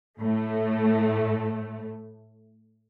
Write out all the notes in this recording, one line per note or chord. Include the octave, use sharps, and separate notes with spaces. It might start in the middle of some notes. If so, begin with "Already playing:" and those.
A2 A3